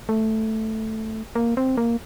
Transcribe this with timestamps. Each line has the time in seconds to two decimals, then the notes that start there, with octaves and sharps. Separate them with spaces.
0.09 A3
1.35 A#3
1.57 C4
1.77 A#3